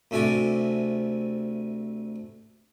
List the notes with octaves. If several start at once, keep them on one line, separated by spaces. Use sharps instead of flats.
D2 C3 A3 G#5 A5 D6